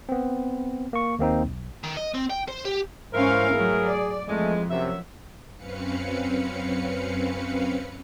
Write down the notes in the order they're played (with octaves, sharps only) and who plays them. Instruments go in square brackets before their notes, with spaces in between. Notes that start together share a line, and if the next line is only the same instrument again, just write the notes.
[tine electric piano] B3 C4
A#3 C#6
D#2 A#3 C4 D#4
B1
[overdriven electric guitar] D#3
D#5
C4
G5
C5
G4
[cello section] G#2 C#4 F5 [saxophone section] E3 E4 A#4 [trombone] C5
[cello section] F#3 A3 [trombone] G#4
[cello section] D5
[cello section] F2 [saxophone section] E3 G#3 [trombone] A3
[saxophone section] F#2 F#3 E5 [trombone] C3
[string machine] F#2 C4 C#4 B4 F5 C#7